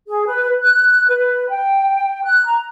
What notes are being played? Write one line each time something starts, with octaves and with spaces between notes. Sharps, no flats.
G#4
B4
F#6
B4
G5
F#6
A#5